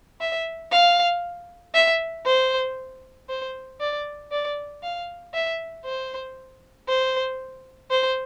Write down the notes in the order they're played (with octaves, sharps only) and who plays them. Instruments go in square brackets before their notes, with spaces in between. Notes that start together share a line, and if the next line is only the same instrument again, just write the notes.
[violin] E5
F5
E5
C5
C5
D5
D5
F5
E5
C5
C5
C5